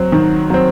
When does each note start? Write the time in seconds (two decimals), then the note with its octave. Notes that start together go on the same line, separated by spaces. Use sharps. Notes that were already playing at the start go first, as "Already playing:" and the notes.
Already playing: F#3 C4
0.12 D#3
0.50 F#3 C4